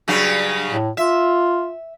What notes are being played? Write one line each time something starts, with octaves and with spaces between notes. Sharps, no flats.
G2 C#3 F#3
A2
F4 E5